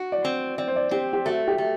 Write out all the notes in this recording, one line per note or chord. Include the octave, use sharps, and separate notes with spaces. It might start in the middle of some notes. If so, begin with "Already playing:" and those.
Already playing: F#4
D5
C4
C4 D5
C5
D5
C4 G4
G4
A3 F#4
G4
A3